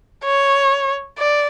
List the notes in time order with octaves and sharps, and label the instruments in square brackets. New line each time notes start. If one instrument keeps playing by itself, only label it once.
[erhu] C#5
D5